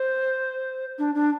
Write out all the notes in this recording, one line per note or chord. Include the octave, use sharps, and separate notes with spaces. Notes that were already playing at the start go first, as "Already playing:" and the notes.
Already playing: C5
D4
D4